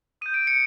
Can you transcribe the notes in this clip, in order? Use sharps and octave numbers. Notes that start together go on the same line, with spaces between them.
D#6 G6 D#7
D7
C#7